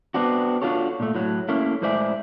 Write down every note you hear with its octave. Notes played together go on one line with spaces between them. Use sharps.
B3 C4 D4 F#4
D4 F4 F#4 A4 C#5
A#2 A3
A2 F#3
A3 A#3 C#4 E4
A2 G#3 C5 D5 E5 G#5